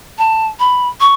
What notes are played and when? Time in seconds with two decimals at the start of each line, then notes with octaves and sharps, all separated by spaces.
0.18 A5
0.60 B5
1.01 C#6